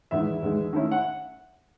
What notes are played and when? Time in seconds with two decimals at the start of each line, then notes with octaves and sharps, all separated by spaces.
0.11 E2 D#3 G#3 E4 E5
0.43 E2 D#3 G#3
0.73 D#3 A3 C#4 E4
0.92 F#5